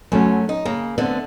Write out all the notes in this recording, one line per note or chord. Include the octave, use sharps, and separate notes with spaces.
F#2 F#3 A3 C#4
D#4
C#3 A#3 A#4
D3 A3 B3 C4